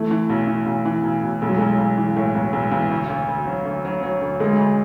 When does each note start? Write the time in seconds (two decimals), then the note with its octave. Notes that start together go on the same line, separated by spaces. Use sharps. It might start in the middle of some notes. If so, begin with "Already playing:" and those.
Already playing: E3 A3
0.11 E3
0.30 B1
0.47 E3
0.66 B1
0.85 E3
1.03 B1
1.23 B1
1.42 B1 G#3
1.49 F#3
1.58 B1 G#3
1.79 B1
1.98 E3
2.17 A2
2.35 B1 F#3
2.53 B1 G#3
2.72 B1 E3
2.90 D2
3.09 D2
3.29 D2
3.47 F#3
3.65 D2
3.85 F#3
4.03 F#3
4.21 D2
4.40 D2 G#3
4.58 D2